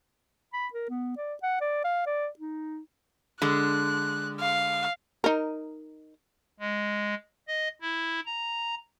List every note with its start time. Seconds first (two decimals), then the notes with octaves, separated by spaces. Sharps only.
0.53 B5
0.73 A#4
0.89 B3
1.17 D5
1.43 F#5
1.61 D5
1.84 F5
2.06 D5
2.39 D#4
3.42 D3 G#3 F#6
4.40 F5
5.24 D#4 A#4
6.59 G#3
7.48 D#5
7.81 E4
8.26 A#5